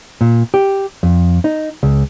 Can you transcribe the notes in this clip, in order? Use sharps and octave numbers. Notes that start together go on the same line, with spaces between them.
A#2
G4
F2
D#4
C#2